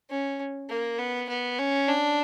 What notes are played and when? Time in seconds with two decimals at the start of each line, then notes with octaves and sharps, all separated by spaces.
0.10 C#4
0.70 A#3
0.99 B3
1.29 B3
1.59 C#4
1.88 D4